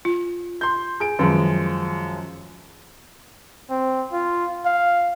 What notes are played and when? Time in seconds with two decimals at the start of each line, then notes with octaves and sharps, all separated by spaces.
0.05 F4
0.61 C6 G6
1.00 G#4 D7
1.19 F#2 D#3 F3 G#3
3.70 C4
4.13 F4
4.65 F5